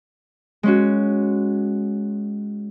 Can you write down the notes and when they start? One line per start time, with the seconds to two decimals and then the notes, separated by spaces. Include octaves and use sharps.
0.63 G#3 C#4 F#4